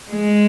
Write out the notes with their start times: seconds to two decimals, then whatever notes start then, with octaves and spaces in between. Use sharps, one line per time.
0.12 G#3